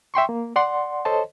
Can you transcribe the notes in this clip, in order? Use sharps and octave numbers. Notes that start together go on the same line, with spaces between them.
E5 G5 C6 C#6
A#3
D5 F#5 C6
A4 C5 C#5 D#5 A5